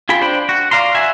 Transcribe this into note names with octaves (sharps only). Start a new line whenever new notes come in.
F4 G#4 G5 B5
D4 C5 G5 B5
F#4
D5 F5 A#5 C6
F#4 E5 G#5